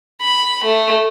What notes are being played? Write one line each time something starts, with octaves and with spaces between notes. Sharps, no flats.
B5
A3